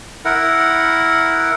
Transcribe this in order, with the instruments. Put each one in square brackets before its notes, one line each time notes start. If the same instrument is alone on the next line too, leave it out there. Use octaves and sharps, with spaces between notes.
[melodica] E4 A#4 F#5